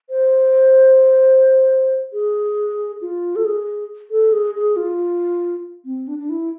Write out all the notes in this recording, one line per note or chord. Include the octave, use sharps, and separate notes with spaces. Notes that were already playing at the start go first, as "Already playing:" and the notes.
C5
G#4
F4
A4
G#4
A4
G#4
G#4
F4
C4
D4
D4
E4